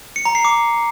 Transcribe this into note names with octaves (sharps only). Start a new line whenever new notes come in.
C#7
A#5
C7
D6